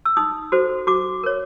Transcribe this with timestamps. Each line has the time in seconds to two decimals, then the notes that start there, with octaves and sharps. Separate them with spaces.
0.05 E6
0.17 D#4 D#6
0.52 F#4 A4 C5
0.87 F#4 D6
1.23 A#4 C#5